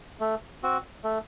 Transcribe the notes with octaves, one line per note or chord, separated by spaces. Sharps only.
A3
C4 F#4
A3